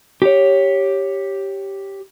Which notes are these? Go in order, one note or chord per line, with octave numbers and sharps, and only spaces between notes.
G4 C#5